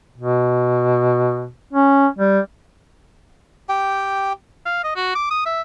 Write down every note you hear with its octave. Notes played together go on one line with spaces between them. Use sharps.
B2
C#4
G3
G4 G5
F5
D#5
F#4
D6
D#6
E5